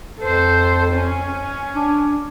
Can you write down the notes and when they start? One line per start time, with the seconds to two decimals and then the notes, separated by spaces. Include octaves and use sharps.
0.20 F2 A4 C5
0.92 C#4
1.74 D4